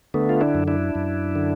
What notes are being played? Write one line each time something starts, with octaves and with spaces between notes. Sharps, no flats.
D3 A3 B3
F4
D4 E4
F#2
D4 E4
F#2
D3